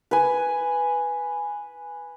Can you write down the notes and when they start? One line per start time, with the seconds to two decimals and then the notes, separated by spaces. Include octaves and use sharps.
0.11 B4 G#5